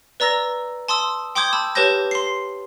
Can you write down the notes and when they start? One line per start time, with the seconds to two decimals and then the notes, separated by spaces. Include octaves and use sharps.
0.20 B4 D5 A#5 E6 A#6
0.88 A5 C6 D#6 E6
1.35 G5 C6 D6 D#6 G6 G#6
1.53 A5 B5 E6
1.75 G4 B4 C#5 A5 G6 A#6
2.11 C6 C7